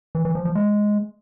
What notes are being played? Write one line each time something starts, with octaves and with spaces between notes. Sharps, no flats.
E3
E3
F3
F3
G#3